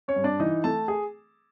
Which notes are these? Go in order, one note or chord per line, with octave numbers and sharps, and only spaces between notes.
C#4 C#5
G2
D4 D5
E3 D#4 D#5
A3 A4 A5
G#4